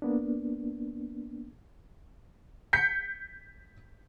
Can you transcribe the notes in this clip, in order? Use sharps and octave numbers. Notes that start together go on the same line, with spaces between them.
A#3 B3 D4
G6 B6 C#7